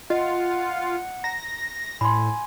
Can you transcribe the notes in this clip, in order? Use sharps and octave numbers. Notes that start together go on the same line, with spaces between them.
F4 D#5 F#5
A#5 A#6
A2 G#5 B5 C6